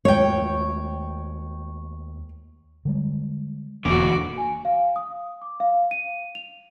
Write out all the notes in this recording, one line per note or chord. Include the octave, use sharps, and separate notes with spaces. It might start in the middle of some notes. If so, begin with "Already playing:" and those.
D#2 G#3 A3 C#5 G5
D3 G3 G#3
E1 D3 E3 A#3 F#4 D6
G#5
F5
D#6
D6
F5
D#7
F7